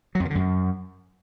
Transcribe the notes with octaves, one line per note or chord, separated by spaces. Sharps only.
F#3
F2
D#3
D3
F#2